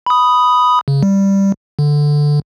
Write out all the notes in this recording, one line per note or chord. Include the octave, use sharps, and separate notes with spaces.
B5 D#6
C#3
G3
D3